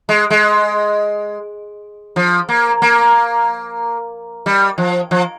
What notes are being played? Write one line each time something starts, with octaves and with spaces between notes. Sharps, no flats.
G#3
G#3
F3
A#3
A#3
G3
F3
F3